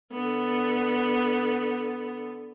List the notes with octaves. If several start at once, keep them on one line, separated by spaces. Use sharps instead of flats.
D3 B3